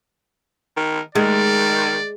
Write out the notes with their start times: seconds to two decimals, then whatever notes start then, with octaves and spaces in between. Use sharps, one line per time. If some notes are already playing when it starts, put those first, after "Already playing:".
0.76 D#3
1.15 D#3 G#3 D5